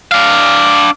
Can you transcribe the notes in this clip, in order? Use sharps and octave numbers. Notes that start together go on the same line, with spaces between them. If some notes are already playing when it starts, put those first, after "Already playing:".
D4 F5